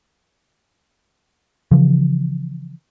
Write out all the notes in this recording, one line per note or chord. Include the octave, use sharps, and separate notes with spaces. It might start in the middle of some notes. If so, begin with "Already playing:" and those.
C#3 E3 F3